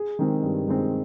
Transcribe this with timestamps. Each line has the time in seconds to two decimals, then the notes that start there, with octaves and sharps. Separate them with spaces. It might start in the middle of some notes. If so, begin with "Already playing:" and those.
Already playing: G#4
0.19 D#3 G#3 C4
0.43 G2
0.67 D#3 G#3 C4